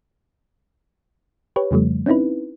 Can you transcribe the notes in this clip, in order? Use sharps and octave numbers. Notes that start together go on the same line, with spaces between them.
G4 B4 C#5
F2 C#3 F3 G3 A3
C4 C#4 D#4 E4 B4